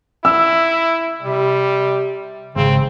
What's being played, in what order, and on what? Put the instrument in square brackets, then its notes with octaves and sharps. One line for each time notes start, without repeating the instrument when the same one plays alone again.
[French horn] E4 [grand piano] E6
[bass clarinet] C3 [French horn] G3
[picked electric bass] G#1 [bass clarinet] C#3 [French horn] C4